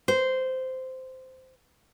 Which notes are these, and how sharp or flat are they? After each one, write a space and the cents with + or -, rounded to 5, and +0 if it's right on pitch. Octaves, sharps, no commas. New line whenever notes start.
C5 -10